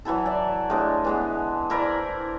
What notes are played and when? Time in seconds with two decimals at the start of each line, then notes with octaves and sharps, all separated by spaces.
0.05 E3 F#3 E4 A4
0.26 D5 E5
0.70 A2 G#3 D4
1.04 E3 G#3 B3
1.70 E4 A#4 C5 D5